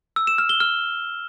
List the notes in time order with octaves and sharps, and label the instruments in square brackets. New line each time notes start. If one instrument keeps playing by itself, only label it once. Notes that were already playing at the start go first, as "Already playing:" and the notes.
[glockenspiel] E6
E7
F6
G7
F6